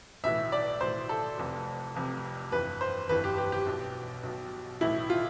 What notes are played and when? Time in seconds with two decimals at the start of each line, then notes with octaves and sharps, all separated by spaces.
0.24 B1 A2 E3 E5
0.52 D5
0.80 B1 A2 E3 C5
1.09 A4
1.38 F1 F2 C3
1.95 F1 F2 C3
2.52 G1 F2 E3 B4
2.81 C5
3.09 G1 F2 E3 B4
3.24 G4
3.38 G4
3.52 G4
3.67 B1 B2
4.23 B1 B2
4.81 B1 A2 E3 E4
5.10 F4